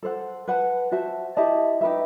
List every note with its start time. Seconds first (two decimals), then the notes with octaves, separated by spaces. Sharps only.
0.03 A4 C5 F#5
0.48 B4 F#5 A5
0.92 F#4 C5 E5 A5
1.37 E4 G4 D#5 A5
1.81 D#4 G4 B4 E5